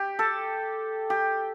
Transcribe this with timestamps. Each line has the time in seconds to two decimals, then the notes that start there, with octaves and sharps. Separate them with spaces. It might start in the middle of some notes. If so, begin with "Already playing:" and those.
Already playing: G4
0.19 A4
1.10 G4